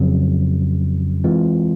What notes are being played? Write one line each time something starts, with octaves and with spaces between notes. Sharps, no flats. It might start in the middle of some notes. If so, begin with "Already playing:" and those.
Already playing: F2 C#3 F#3
E3 G#3 C4 F4